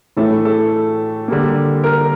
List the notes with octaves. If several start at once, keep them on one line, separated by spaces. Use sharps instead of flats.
A2 E3 A3 A4
A4
D3 G3 A#3
A#4